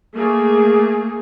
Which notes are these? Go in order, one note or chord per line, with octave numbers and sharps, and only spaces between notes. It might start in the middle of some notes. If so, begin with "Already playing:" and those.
A3 A#3 G#4